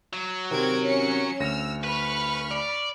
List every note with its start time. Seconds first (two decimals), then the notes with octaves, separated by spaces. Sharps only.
0.13 F#3
0.51 C3 D#3 C4 A#4 G#6 D7
0.82 C#4 C#7
1.40 D2 E6 F6 A#6 C#7
1.84 B4 B5 C#6 F6
2.51 D5